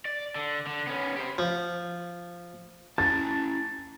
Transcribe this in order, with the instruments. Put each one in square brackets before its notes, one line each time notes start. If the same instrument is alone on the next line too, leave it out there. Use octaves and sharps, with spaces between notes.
[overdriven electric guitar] D5
D3
D3
B3 C#4
G4 C5
[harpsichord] F3
[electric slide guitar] C#4 E4 A5 [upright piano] A6